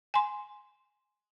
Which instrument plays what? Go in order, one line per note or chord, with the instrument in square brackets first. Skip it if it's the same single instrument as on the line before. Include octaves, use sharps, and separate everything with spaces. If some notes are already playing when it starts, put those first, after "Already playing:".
[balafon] G#5 C6